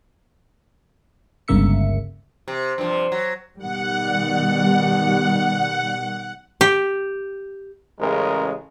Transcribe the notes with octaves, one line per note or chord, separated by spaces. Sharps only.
G1 C#2 C#3 A#3 E5 C#7
C3
G2 C3 F3
F#3
B2 D#3 G3 F#5
G4
A1 C#3 G#3 A#4